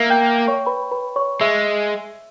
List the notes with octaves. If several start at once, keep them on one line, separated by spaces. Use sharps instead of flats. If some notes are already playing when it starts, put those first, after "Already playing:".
Already playing: A#3 E5 E6
G5 G6
C#5 C#6
B4 B5
B4 B5
C#5 C#6
G#3 E5 E6